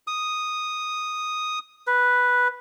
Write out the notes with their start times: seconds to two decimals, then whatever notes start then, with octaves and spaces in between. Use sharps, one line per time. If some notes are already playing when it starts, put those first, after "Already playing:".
0.07 D#6
1.87 B4